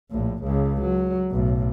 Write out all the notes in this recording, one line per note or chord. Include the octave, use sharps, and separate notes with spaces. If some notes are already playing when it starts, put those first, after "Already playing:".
A#1 A2
C#2 C#3
F#3
B1 A2